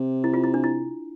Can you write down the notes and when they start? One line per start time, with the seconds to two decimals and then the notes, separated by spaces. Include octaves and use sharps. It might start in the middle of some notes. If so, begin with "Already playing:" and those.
Already playing: C3
0.24 E4
0.34 F4
0.44 E4
0.54 D4
0.64 E4